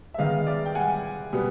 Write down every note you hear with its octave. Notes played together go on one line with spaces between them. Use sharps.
E5
D#3 G#3 B3 D#5 F5
D5 E5
G5
F#5 G#5
B2 G3 B3